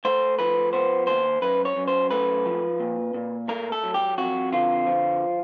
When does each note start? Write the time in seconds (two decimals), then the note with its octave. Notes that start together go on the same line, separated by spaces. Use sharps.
0.05 A3 C5
0.39 F3 B4
0.73 B3 C5
1.07 D#2 C5
1.42 F#2 B4
1.65 C#5
1.76 F#2
1.88 C5
2.11 A3 B4
2.45 F3
2.80 A#2
3.14 A#2
3.48 A3 A#4
3.72 A4
3.83 F#3
3.94 G4
4.18 F2 F#4
4.53 D3 F4
4.86 F3